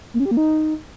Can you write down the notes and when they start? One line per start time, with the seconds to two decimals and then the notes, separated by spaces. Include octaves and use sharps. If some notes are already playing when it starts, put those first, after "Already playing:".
0.14 A#3
0.20 C#4
0.25 G4
0.31 A#3
0.37 D#4